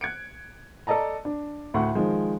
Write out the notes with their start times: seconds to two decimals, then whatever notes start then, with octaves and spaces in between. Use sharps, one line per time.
0.01 F#6 G#6 C#7 D7
0.87 A4 D5 D#5 A5 A#5
1.25 D4
1.74 D2 A2 F#5 C6 C#6
1.95 D#3 F3 G#3